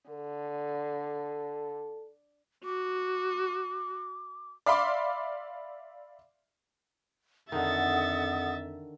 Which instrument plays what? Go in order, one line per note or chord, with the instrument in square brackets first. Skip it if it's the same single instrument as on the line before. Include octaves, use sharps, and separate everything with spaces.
[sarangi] D3 [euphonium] A4
[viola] F#4 [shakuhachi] D6
[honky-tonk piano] D5 E5 F5 B5 C6 D6
[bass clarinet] F2 [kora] D3 D#3 [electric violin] E5 A6 [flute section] F#5 D#6